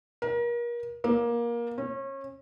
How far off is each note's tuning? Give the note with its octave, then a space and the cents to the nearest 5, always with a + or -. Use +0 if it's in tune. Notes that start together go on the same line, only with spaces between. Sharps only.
A#4 +35
A#3 +20
C#4 -30